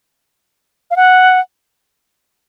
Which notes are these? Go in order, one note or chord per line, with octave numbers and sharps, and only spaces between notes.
F5
F#5